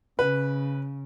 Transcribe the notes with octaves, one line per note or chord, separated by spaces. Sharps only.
C#3 B4